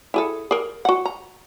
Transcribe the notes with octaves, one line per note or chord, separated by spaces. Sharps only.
E4 G#4 A4
G#4 A#4
F#4 F#5
A#5